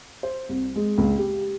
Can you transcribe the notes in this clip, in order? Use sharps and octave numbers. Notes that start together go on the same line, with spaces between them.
C5
C2
G#3
C#2
G4